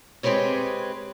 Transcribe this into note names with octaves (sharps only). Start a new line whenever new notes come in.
G#3 C4 G4 G#4 B4 C#5